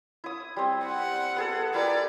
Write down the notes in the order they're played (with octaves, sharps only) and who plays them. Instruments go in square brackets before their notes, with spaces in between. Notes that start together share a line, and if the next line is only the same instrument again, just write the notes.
[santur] E4 D#6
G3 C4
[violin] F#5
[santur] B3 G#4 A4
[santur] E4 G4 A#4 [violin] D5